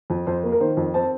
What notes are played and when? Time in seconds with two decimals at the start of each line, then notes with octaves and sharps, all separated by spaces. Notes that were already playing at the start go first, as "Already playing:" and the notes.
0.10 F2
0.26 F2 C5
0.44 A#3
0.52 A#4
0.60 D#3 C5
0.77 F2
0.94 C4 A5